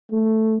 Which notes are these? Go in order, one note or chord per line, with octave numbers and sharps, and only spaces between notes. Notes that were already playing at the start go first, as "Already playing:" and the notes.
A3